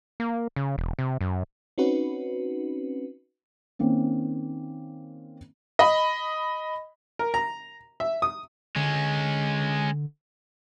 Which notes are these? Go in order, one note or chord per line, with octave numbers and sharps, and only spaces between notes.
A#3
C#3
E1
C3
F#2
C4 C#4 D#4 F#4 B4
D#3 A#3 C4 C#4
D#5 B5
A#4
A#5
E5
D#6
D3 G#3 C#4